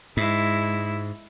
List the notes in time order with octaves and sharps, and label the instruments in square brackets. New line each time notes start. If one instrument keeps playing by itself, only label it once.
[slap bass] G#2 [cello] G#3 E4